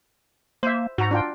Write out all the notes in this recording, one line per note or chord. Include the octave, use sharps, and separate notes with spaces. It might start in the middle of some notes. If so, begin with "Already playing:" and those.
A#3 C5 E5
G#2 F#4 A#5
D4 F4 G5